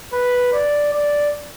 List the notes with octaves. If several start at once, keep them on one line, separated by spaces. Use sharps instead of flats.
B4
D5
D5